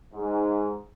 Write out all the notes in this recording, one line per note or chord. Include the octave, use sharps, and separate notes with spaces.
G#2